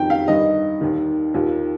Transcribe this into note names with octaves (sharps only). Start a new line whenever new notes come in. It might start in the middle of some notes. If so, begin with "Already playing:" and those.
Already playing: F2 D#3 G5
F5
G2 D#3 D#5
D#2 D#3
D#2 D#3 F4